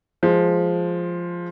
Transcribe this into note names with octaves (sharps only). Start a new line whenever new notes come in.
F3 G#3